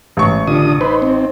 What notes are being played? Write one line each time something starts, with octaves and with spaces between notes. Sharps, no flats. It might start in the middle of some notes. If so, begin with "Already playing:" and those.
A1 E3 G#3 C#5 C#6
D3 D4 F4 G4 D#6
D#4 B4 C5
C4